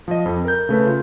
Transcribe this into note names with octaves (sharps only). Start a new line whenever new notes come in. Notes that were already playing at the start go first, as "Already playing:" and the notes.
F3 D#5
F2
A#4 G6
C#3 A3 B4
F4